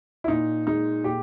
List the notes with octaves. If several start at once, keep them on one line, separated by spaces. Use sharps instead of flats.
E4
A#2 D#4
G#3 D#4
A#2 G4